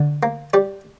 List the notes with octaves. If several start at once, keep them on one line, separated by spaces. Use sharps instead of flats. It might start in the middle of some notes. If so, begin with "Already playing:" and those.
Already playing: D3
A#3
G3 D5